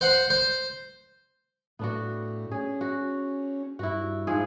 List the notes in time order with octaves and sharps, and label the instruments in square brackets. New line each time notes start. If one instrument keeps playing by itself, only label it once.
[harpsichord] C5 F#5 C6
C5
[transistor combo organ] A2 [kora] B3 D4 F#4
[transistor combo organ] C#4 [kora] G#4
[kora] F#4
[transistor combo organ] G2 [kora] E4 F#4
[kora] G#2 F3 G#4